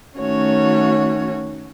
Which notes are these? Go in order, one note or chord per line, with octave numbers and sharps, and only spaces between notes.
D#3 A3 C#4 F#4 C#5